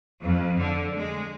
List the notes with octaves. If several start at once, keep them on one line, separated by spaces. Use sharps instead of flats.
F2
D3
G#3